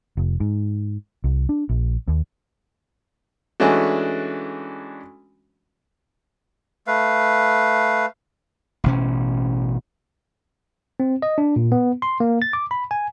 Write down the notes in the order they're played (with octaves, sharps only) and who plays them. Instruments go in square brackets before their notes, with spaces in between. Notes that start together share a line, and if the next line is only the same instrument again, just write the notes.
[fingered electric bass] F1
G#2
C2
D4
A#1
D#2
[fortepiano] E3 G#3 A3 C#4 D4 F#4
[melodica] A3 B4 F5
[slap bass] A1 B2 C#4
[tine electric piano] C4
D#5
D4
A#2
B3
C6
A#3
A6
D6
B5
G#5